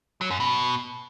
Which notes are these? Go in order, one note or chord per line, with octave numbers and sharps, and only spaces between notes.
F#3
F#2
B2